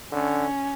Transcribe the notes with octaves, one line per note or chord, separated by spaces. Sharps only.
D3 C#4